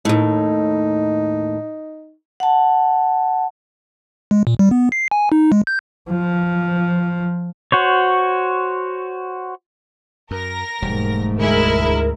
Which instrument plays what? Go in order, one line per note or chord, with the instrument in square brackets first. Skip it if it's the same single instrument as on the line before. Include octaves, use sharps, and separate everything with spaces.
[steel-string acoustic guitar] D#2 A2 [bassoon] D#4
[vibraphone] F#5 A5
[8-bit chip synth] G#3
A#2
G3
B3
C7
G#5
D#4
G#3
G6
[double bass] F3
[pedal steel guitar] F#4 C5 C#5
[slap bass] F#2 [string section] A#4 A#6
[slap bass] E1 G3 [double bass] G#2 A3
[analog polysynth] D2 A#4 [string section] G#3 E4